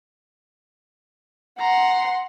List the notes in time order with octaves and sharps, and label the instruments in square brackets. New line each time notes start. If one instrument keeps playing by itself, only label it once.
[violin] F#5 C6 [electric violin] A#5